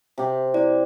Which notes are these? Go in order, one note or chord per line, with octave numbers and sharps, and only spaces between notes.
C3 G4
E4 D5